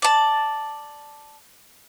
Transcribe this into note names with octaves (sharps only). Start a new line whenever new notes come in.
D5 A5